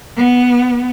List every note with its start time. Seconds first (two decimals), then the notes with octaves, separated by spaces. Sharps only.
0.17 B3